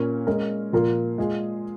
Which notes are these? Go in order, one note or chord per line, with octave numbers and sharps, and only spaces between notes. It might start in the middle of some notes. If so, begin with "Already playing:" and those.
Already playing: A#2 A#3 C#4 A#4
G#3 C#4 A#4
A#2 F3 A#3 F4 A#4
G#3 F4 G#4